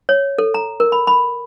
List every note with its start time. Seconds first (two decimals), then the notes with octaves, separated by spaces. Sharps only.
0.09 C#5
0.38 A4
0.54 A#5
0.80 A#4
0.92 B5
1.07 B5